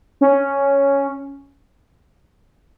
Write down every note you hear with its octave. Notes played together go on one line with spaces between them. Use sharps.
C#4